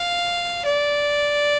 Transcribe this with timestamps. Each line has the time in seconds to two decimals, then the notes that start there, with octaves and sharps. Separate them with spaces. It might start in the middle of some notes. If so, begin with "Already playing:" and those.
Already playing: F5
0.66 D5